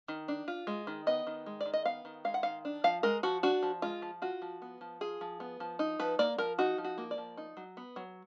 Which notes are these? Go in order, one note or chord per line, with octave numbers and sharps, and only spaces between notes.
D#3
D4
F4
G#3
D#3
B3 D#5
D#3
G#3
D5
D#3
D#5
B3 F5
D#3
G#3 F5
F#5
D#3 F5
D4
F3 F5
G#3 A#4
F3 F#4
D4 F#4
F3
G#3 F4
F3
F4 F#4
F3
B3
F3
F4 G#4
F3
B3
F3
D#4
F3 B4
A#3 D5
F3 A#4
D#4 F#4
F3
F#4
A#3
D5
F3
D#4
F#3
B3
F#3